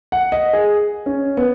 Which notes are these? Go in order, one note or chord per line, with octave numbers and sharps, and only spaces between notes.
F#5
D#5
G#4
C#4
B3